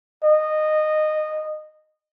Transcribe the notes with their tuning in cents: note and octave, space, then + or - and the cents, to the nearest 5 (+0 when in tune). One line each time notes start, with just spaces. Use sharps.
D#5 -15